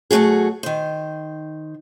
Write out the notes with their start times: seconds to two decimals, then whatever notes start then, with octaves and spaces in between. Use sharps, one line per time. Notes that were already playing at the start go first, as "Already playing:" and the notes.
0.11 B2 F#3 A3 F#4 G#4
0.63 D#3 C5